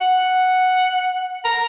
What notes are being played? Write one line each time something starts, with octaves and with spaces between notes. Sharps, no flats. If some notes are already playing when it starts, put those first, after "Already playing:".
F#5
A#5